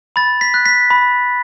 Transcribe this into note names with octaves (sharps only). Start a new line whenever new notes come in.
B5 A6
B6
F#6
B6
B5